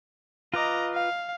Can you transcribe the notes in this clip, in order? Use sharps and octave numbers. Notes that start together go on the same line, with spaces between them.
F4 B4 D#5 A#5 D6
F5